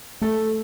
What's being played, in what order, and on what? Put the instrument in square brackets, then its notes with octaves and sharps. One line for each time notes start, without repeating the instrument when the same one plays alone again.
[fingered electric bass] A3 [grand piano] A4